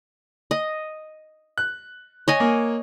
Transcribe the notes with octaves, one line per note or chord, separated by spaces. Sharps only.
D#5
F#6
C#5 D#5 G#5
A#3